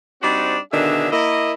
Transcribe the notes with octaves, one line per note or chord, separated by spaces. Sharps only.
G3 C4 D4 D#4 F#4 C5
B2 D3 D#3 D4 G#4 E5
A#3 E4 D#5